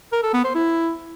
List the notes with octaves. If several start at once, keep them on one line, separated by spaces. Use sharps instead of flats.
A#4
A4
B3
C5
E4